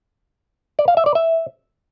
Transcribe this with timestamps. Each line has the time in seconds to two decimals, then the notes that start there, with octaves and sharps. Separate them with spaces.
0.79 D5
0.88 F5
0.97 E5
1.06 D5
1.15 E5